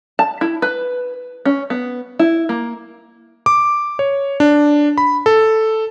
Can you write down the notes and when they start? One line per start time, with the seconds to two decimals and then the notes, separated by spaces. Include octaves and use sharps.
0.19 A5
0.41 E4
0.62 B4
1.45 C#4
1.70 B3
2.19 E4
2.49 A#3
3.46 D6
3.99 C#5
4.40 D4
4.98 B5
5.26 A4